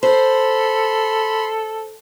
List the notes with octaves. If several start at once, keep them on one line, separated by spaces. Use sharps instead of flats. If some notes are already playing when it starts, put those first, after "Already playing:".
A4 C5 B5 C6